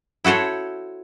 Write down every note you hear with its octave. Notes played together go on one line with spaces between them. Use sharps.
E4 F#4 A4 C5 C#5